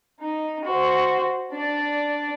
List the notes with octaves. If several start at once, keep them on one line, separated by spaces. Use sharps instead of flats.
D#4
F#4 C5
D4 D5